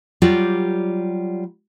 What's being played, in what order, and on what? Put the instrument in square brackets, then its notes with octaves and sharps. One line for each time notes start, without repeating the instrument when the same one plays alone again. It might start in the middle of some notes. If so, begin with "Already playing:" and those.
[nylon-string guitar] F#3 G3 F4 G4 D5